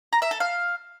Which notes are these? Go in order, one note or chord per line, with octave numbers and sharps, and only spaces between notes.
A#5
E5
A4
F5